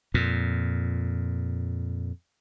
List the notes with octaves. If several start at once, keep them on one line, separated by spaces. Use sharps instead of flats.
F2 A#2